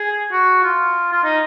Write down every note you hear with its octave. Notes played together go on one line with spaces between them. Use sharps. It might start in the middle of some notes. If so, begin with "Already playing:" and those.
Already playing: G#4
F#4
F4
F4
D#4